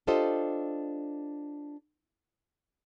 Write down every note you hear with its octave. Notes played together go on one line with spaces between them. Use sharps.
D4 F4 G4 A4 C5 D#5